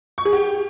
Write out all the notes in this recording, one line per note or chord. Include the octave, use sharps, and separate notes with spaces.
C#6
G#4
G4